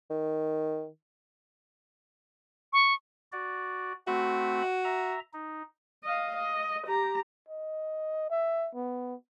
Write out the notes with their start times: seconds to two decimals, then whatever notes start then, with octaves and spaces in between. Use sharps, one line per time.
0.11 D#3
2.73 C#6
3.32 F#4 D5
4.07 A3 C4 F#4 B5
4.84 E5 A#5
5.33 D#4
6.04 D#5 F5
6.37 D#5
6.87 G4 A#5
7.49 D#5
8.31 E5
8.75 B3